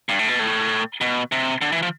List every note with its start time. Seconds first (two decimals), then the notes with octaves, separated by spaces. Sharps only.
0.09 G2
0.19 A2
0.29 B2
0.39 A2
1.01 B2
1.32 C3
1.61 D3
1.72 E3
1.82 F3